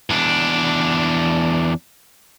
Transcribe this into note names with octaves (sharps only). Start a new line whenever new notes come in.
E2 D4